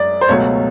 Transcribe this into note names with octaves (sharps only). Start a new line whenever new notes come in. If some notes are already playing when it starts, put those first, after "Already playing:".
Already playing: F#2 G#3 D5
C5
C#2 B2 F#3 A3 C#5